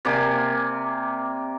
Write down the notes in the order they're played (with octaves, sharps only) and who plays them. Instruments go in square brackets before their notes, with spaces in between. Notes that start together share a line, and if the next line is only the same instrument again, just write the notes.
[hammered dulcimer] C3 A#3 D5 G#5